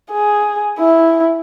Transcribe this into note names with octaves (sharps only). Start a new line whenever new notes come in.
G#4
E4